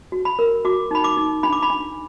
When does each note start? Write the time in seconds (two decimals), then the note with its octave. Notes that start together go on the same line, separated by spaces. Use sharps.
0.12 F#4
0.25 B5
0.39 A#4
0.65 F#4 D6
0.91 D#4 B5
1.04 D6
1.17 D#4
1.43 D4 B5
1.52 D6
1.62 B5
1.70 D4